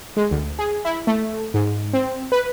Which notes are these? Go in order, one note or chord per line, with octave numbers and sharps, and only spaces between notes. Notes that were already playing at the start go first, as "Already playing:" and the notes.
G#3
D2
G#4
E4
A3
G#2
C4
B4